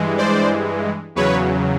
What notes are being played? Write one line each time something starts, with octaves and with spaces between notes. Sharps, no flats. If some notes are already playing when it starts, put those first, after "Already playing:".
Already playing: G2 E3 G#3
C5 D5
E2 C#3 F#3 B4 C#5